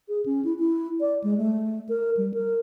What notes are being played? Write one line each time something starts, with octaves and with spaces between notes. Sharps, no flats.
G#4
C#4
E4
E4
D5
G#3
A3
A#4
G3
A#4